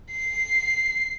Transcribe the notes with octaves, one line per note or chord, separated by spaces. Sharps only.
C7